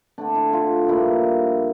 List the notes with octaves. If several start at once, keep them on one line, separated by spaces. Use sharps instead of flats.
D3 A3 C4 D4
E4
F4
G2 F3 A#3 E4